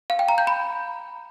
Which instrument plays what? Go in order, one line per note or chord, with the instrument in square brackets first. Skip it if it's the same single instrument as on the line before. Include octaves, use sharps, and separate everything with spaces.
[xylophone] F5
G5
A#5
G6
B5